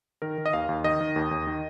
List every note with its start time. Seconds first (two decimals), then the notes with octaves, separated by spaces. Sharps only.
0.22 D#3 A#4
0.38 D#3
0.46 D#5
0.53 D#2 F5
0.69 D#2
0.84 D#3 D#5
1.01 D#3
1.16 D#2
1.31 D#2
1.47 D#3